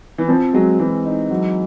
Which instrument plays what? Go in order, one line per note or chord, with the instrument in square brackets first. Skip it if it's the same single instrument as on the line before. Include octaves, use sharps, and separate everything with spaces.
[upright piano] E3
[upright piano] F3 [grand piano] C4
[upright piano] F#3 [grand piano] G#3
[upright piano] E3 [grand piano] G#3
[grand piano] D#4
F#3